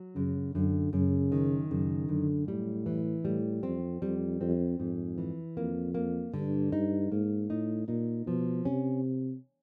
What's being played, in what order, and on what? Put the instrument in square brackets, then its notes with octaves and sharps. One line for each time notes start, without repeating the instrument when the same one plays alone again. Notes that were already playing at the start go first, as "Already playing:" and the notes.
Already playing: [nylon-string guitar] F#3
[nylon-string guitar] F#2 [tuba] C#3
[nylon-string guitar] F#2 [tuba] D3
[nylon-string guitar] F#2 [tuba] C#3
[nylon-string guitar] D#3
[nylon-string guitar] F#2 [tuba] C#3
[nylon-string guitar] F#2 [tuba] D3
[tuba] A2 [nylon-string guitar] G3
[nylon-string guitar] E3
[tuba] A2 [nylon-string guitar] G3
[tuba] F2 [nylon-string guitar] C4
[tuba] F2 [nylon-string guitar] G3
[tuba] F2 [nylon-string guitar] C4
[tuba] F2 [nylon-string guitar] G#2
[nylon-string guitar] E3
[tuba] F2 [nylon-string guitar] A#3
[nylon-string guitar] A#3
[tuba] G2 [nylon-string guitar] D3
[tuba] G2 [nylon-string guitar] D#4
[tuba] G#2 [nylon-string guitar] A#3
[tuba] A2 [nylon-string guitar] D#4
[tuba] A#2 [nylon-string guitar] D#4
[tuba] B2 [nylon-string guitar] F3
[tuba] C3 [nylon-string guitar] C#4